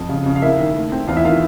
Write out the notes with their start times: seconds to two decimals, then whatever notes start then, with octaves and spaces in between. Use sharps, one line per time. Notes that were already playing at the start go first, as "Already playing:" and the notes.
Already playing: F2
0.09 C#3
0.26 C#3
0.36 F5
0.42 A#3 E4 E5
0.59 D#3
0.76 A3
0.92 C4
1.08 E2 F4 F5
1.16 E4 E5
1.25 D#3 F4 F5